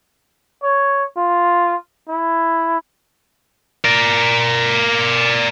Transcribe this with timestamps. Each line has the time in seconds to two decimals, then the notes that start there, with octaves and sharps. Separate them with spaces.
0.63 C#5
1.17 F4
2.09 E4
3.84 A#4 D5